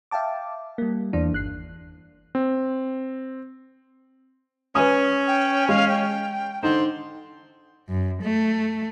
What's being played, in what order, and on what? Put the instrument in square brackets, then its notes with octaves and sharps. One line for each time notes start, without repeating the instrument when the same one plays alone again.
[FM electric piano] E5 F5 G5 A5 D6
G3 A#3
E2 E3 D4
G1 F#6 C7
[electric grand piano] C4
[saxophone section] C#4 [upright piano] B4 G#5 D#6
[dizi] G5
[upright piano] G#3 [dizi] F5
[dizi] G5
[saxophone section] D3 C5 [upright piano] D#4 [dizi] C6
[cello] F#2
A3